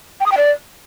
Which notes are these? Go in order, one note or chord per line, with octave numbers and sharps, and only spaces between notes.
G5
D#6
G5
D5